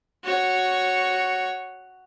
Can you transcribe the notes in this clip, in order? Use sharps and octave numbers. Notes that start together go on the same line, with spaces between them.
F#4 C#5